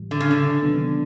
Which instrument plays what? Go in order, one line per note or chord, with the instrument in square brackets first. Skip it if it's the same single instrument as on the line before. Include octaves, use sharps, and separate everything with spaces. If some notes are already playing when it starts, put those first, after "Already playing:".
Already playing: [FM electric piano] A2 E3 G3
[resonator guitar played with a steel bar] D3
C#3
D3
[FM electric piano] C3 D#3 F#3 B3 D4